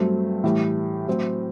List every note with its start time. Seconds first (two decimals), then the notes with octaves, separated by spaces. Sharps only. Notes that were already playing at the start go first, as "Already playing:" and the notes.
Already playing: G2 F#3 A3 C4
0.44 A2 E3 G3
1.08 A2 F#3 C4